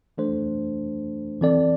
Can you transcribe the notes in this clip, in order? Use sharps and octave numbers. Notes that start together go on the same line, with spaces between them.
E3 A3 D4 A4 C5
E3 C4 A4 D5